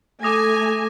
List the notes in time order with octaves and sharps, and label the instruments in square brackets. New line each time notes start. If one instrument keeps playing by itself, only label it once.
[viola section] A3 G#5 [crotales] D6 D#6 A#6